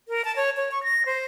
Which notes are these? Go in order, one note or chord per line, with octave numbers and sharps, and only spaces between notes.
A#4
A5
C#5
C#5
C#6
A#6
C5